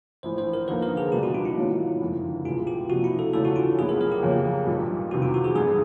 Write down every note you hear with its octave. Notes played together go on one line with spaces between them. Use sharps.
A#1 A2 E3 C5
C5
A#4
F2 D3 F3 A#3 D#4 B4
A#4
G#4
C#2 B2 G3 B3 D4 G4
F#4
F4
E4
G#2 D#3 F#3 A#3
F#1 F2 D3
C2 B2 G#3 F4
G4
C3 F3 A#3 D4 F#4
E4
A4
E2 C#3 E3 A3 D4 A4
F#4
F4
A#1 A#2 F#3 B3 E4 G#4
A#4
A#4
G4
F2 C#3 F#3 A#3 C#4
B1 A#2 G3
F1 E2 C3 D#3 F#4
F4
F#4
G#4
G2 D3 G3 G#4